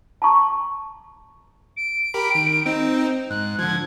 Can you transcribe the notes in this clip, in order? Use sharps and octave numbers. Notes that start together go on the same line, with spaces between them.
A5 A#5 C#6
D7
G4 A#4 B5
D#3
C4 D#4
G#2 F#6
D3 F3 G#6